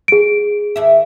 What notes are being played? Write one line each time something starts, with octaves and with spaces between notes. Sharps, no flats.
G#4 D7
D#2 E5